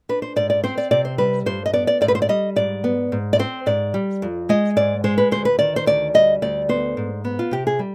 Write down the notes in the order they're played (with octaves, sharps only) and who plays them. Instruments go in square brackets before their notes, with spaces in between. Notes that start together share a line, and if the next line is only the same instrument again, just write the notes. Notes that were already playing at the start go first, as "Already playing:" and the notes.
[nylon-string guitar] D4 B4
C5
G#2 D5
D5
C4 C5
D5
C3 D5
C5
G3 B4
G2 C5
D#5
B3 D5
D5
G#2 D5
B4
C5
D5
G3 D#5
G#2 D5
B3
G#2
D5
C4 C5
G#2 D5
G3
F2
G#3 D#5
G#2 D5
G#3 C5
B4
D2 C5
B4
D#3 D5
C5
D2 D5
G3 D#5
D2 D5
B3 C5
G#2
B3
F4
C3 G4
G#4
G3